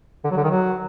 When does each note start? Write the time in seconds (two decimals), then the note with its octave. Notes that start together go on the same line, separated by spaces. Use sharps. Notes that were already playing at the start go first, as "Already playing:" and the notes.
0.24 D3
0.31 F#3
0.37 D3
0.43 D#3
0.50 F#3